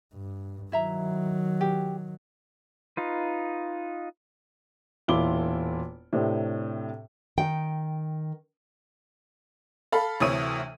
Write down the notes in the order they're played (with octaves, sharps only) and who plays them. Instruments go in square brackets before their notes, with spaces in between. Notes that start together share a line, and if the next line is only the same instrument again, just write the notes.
[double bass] G2
[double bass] D#3 F#3 [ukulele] E4 E5 A#5
[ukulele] G4
[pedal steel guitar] D#4 F4 B4
[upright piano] E1 A#2 E4 F4 D6 G7
A2 C3 C4 D4
[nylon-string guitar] D#3 G5
[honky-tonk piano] A4 F5 B5
D2 C3 E3 C#5 D#6 D#7